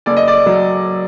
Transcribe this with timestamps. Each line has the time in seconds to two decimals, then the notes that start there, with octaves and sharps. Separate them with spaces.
0.06 F#1 D5
0.16 D#5
0.28 D5
0.46 F#3